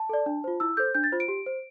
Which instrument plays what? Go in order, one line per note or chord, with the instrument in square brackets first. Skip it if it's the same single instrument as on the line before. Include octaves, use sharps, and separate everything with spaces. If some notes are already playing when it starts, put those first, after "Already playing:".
Already playing: [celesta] A5
A4 D5
D4
F4 C5
E4 E6
A4 C5 G6
D4 G6
A6
F4 C5
D7
G4
C5